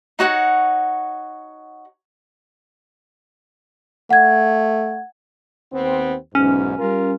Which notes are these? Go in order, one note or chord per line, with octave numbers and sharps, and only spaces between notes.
D#4 F#4 C#5 F#5
A3 F#5 G#6
D#2 B3 C4
B1 E2 G#2 C#4
G3 F4 A#4